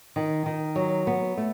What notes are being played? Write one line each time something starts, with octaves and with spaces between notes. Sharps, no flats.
D#3
D#3
F#3
B3
A3